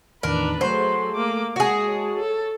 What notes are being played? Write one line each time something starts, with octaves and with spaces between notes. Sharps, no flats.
E2 A2 D#3 D4 A#4 B4
F#3 A3 G#4 A4 C5
A#3 D6
G#3 F#4 G#4
C#5 A5
A4